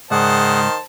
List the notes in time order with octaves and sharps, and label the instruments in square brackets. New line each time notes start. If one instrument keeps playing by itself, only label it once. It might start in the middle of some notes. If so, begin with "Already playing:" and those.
[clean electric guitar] C#2 G#2 D5 [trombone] D#3 [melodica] G#4 F#5 [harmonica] C5 A5